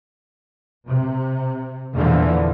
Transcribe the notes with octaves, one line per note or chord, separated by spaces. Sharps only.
C3
E2 A#2 D3 E3 F3